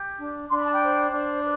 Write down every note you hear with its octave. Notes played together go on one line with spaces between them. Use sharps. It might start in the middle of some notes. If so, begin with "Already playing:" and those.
Already playing: G4
D4
D4 C6
B5
A5
G5 B5
C5
D4
B4